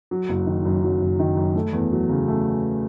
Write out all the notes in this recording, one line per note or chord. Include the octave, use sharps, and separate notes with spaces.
F#3
F#1
D#3
F#2
F#3
F#1
D#3
F#2
A3
E2
F#3
C#3
A3